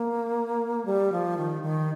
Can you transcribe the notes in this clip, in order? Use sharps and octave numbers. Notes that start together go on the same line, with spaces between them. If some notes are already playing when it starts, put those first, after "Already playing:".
Already playing: A#3
G3
F3
D#3
D#3